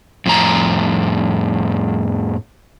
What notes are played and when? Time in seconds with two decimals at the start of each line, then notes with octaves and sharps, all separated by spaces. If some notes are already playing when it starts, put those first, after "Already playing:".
0.26 F2 A2 A#5